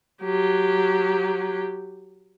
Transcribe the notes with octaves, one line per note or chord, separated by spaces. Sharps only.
F#3 G4